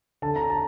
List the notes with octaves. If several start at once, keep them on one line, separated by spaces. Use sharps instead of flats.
D3 A5
A#5
A5